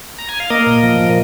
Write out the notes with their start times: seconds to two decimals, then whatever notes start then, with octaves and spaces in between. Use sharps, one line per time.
0.19 A#5
0.29 G#5
0.40 F5
0.50 A#3 A#4 D#5
0.67 A#2
0.83 F3
1.00 A#2